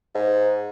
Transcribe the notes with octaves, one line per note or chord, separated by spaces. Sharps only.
G#2